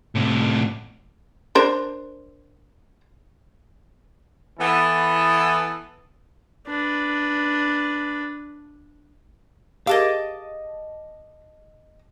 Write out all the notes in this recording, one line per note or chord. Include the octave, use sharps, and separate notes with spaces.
A2 C3
D4 A#4 C5
E3 B3 A4
D4 B4
G4 G#4 A#4 D#5 F5 A5 D6